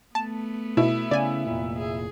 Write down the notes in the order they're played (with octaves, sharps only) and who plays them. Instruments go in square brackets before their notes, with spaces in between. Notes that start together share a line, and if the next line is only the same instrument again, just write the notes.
[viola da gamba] A3 B3 [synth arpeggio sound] A5
[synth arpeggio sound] B2 [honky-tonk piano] E4
[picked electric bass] C#3 [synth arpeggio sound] D5 G#5
[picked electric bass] F1 A#2
[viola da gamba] G#4